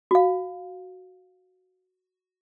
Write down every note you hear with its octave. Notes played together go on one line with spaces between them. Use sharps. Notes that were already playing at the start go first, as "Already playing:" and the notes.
F#4 F5